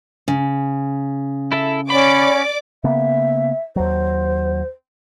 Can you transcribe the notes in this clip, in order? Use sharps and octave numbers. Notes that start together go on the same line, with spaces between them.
C#3
E4 A4 E5
C#4 C#5 D5 F#5 B5 D6
C#3 A#3 B3 E5
D#2 F#3 C5